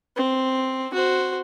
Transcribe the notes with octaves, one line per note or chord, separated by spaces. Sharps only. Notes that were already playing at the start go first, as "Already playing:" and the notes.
C4
F#4 C5